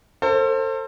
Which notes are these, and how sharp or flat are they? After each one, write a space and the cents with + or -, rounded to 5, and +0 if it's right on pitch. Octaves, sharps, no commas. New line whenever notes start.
A4 +35 C5 +25